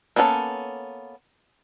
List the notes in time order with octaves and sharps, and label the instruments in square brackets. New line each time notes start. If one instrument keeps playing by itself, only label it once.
[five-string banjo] A#3 B3 C#4 G#4 A4